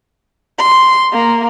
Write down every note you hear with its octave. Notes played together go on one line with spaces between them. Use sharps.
C6
A#3